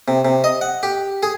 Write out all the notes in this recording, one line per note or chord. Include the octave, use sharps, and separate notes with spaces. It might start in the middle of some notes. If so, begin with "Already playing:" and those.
C3
C3
D#5
F#5
G4
G#4